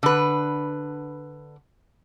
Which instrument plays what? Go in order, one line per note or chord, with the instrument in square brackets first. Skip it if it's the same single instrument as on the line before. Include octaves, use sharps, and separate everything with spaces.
[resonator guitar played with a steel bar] D3 B4